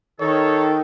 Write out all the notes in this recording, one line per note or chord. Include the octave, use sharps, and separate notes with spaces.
D#3 A4 C#5